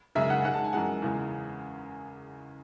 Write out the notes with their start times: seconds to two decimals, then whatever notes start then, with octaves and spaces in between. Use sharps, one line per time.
0.15 F#2 C#3 G#3 E5
0.30 F#5
0.44 G#2 G#3 F#5
0.54 A5
0.64 G#5
0.73 F#2 E3 G#3 F#5
1.02 E2 C#3 E3 G#3